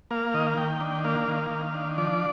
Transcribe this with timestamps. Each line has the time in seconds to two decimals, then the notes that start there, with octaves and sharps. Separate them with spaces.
0.11 A#3 F5
0.34 D#3 D#5
0.47 F5
0.57 D#3 G5
0.81 D4
1.04 A#3 F5
1.28 D#3
1.50 D#3
1.74 D4
1.98 F3 D5